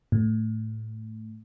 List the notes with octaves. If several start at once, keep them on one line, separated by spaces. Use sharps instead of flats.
A2